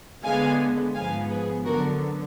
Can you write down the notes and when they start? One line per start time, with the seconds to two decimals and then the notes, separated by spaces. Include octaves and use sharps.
0.23 D3 G#3 B3 F5 G#5
0.95 G#2 F3 B3 F5 G#5
1.29 G#4 B4
1.65 D3 F#3 B3 F#4 A#4